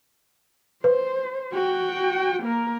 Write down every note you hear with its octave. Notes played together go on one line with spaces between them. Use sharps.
B4 C5
F#4 G5
A#3 A#4